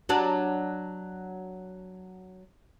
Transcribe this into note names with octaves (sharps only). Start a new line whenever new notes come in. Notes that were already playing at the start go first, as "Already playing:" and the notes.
F#3 D4